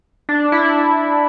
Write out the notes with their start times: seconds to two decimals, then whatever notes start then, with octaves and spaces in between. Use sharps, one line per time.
0.29 D4
0.52 E4